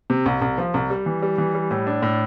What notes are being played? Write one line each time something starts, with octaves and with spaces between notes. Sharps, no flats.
C3
C2
C2
F3
C2
G3
E3
G3
E3
G3
A2
D4
A2